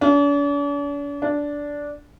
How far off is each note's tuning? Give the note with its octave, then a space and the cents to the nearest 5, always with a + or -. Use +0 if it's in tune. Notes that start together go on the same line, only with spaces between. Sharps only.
D4 -45
D4 -10